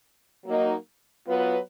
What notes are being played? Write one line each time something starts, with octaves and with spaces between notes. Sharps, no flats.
F#3 A#3 D#4
F#3 B3 F4 B4